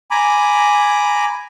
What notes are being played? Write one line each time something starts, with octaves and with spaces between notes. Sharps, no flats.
G#5 A#5 B5 D6